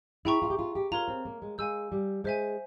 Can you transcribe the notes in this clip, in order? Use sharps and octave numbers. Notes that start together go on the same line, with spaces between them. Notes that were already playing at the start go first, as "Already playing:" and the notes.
E4 G#4 E5 G5 A#5 C#6
F4
G4
F4
G4
F4 A#4 C#5 F5 A#5
C4
A#3
G#3
G#3 F5 G#5 E6 G6
G3
G#3 C5 E5 G#5